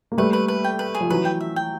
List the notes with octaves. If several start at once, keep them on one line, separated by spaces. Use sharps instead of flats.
A#3
G3 A3 B4
B4
B4
G5
B4
G#4
F3
E3 F#3 B4
G5
E5
G5